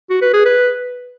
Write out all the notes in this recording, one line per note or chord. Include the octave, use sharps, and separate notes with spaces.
F#4
B4
G#4
B4